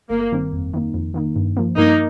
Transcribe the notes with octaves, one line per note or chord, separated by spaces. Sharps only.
G1 A#3
G2 D#3 G3 C4
F2
D#3 A#3 D#4
F2
D#3 A#3 D#4
G2
F3 A#3
G2 A#3 D#4